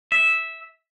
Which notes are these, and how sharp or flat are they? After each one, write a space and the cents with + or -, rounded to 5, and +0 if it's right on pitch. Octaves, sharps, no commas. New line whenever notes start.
E5 -10